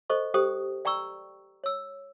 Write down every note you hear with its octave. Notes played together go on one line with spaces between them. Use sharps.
A4 C5 D#5 C#6
G4 A4 C5 G5 D#6
D5 G5 A#5 C#6 E6
C#5 E6